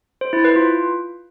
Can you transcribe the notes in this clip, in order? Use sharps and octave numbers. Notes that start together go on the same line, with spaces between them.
C5
E4
B4
F4